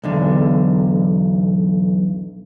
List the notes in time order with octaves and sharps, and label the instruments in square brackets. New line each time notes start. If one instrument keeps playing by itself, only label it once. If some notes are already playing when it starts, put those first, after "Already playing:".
[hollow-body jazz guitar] B1 E2 D3